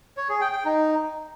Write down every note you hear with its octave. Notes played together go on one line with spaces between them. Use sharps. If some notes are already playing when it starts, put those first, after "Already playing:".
C#5
G#4
G5
G5
D#4